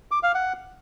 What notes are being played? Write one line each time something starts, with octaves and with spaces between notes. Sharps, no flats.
D6
F5
F#5